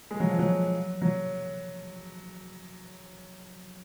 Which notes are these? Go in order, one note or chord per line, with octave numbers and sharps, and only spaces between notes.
G#3
F#3
F3
F#3
F#3